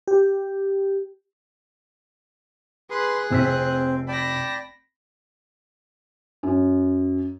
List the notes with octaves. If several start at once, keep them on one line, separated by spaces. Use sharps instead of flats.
G4
G#4 B4 C6 F#6
F1 C4 E6 B6
D5 G5 A5 B5 A#6
F#2